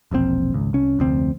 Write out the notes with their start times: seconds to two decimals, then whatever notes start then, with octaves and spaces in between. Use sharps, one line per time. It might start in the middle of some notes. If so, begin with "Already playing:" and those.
0.11 E1 A#1 A2 C4
0.54 G#1 C#2
0.73 C2 C#4
0.99 F1 D2 C4